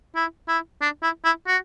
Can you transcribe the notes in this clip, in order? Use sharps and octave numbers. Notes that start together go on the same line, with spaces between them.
E4
E4
D4
E4
E4
F#4